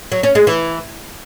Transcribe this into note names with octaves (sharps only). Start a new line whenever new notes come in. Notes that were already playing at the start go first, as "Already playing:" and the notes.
F#3
C#4
G#3
E3